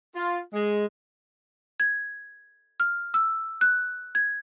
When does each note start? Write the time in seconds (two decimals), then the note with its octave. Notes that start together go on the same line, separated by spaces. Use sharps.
0.15 F4
0.53 G#3
1.80 G#6
2.80 F6
3.14 E6
3.61 F#6
4.15 G#6